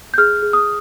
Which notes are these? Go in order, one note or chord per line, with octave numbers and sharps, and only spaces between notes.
G6
G#4 F6
G#4
D#6